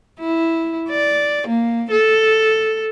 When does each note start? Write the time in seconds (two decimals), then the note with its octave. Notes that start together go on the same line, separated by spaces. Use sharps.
0.20 E4
0.90 D5
1.48 A#3
1.91 A4